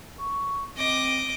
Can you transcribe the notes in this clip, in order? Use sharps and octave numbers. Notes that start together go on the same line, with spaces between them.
C#6
C4 D#5 D6